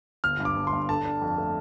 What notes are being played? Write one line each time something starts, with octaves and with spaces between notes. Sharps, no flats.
G1 F6
G2
D6
G1
C6
G2
D3 A5
D4
F2
A3